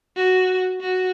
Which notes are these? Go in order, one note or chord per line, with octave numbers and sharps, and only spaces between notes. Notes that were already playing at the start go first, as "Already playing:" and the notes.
F#4
F#4